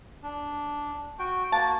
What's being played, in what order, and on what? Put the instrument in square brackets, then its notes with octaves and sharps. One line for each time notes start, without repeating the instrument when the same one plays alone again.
[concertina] D4
F#4 G5
[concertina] A#3 F#4 [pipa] A5